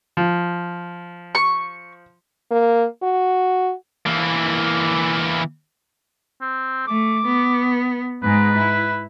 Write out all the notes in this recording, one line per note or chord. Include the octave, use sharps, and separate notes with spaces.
F3
C#6
A#3
F#4
E3 A#3
C4
A3 D6
B3
G#2 G#3 B4
E4